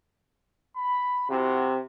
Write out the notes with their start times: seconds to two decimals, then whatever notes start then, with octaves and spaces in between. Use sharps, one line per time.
0.77 B5
1.30 C3 E4 F#4